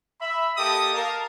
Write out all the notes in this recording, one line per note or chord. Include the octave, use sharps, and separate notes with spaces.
E5 B5
A#3 G4 A4 D#5 A5 D#6
A#4 F5 A5